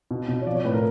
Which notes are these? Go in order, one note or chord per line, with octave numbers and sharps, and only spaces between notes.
B2
B2
C#5
F3 D5
C#5
A2 B4
A#4